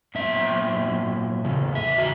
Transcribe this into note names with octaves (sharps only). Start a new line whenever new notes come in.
A#2 F#3 B3 E5
E2 C#3
E5
F#4